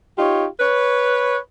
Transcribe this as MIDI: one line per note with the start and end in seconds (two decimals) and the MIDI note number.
0.18 0.46 63
0.18 0.46 65
0.18 0.46 67
0.18 0.46 73
0.60 1.38 71
0.60 1.38 73